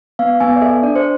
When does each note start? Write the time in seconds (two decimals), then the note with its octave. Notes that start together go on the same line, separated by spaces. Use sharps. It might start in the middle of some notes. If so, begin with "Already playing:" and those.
0.19 B3 F5
0.40 B3 G#5
0.56 D5
0.62 A4 E5
0.83 D4 D5
0.95 C5